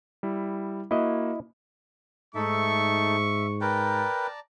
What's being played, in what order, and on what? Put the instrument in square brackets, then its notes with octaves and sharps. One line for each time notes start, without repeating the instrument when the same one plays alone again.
[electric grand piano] G3 E4
[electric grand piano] A#3 F#4 [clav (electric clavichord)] E4 D#5
[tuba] G#2 [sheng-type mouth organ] A3 D#4 A4 [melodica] E5 [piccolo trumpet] C#6
[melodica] A#4 B4 G5 [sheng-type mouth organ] D5 A5 A#5